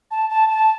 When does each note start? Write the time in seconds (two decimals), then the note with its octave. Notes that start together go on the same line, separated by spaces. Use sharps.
0.11 A5
0.30 A5
0.49 A5